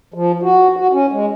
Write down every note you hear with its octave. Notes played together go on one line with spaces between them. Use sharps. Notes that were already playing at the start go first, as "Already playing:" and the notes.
F3
F#4
F#4
C#4
G#3